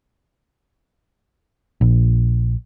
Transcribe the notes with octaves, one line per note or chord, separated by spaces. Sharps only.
A#1